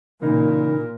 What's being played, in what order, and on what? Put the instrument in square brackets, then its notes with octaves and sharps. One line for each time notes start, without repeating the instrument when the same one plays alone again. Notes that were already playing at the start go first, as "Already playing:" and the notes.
[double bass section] A#2 [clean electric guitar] C#3 E3 D#4 [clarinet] A#4